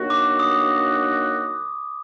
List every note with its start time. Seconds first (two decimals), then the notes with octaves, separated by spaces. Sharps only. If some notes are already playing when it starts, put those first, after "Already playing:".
Already playing: D#3 F#3 A#3 D4 F#4
0.10 D6
0.39 D#6